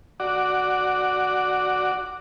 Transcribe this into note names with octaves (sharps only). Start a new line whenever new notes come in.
F#4 D5